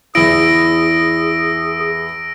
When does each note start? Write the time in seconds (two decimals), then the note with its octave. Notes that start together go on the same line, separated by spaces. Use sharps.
0.15 E2 E4 G#4 E6 A#6 D7